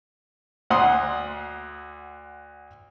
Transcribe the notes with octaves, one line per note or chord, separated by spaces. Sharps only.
D2 F#5 C6 D#6